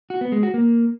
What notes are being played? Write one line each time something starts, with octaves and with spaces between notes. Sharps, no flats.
F#4
B3
G#3
F#4
A#3